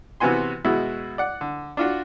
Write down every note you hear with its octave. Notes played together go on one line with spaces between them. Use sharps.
C3 E3 B3 F#4 G#5 C6
B2 G#3 E4 F#4
D5 F#5
D3
D4 F4 F#4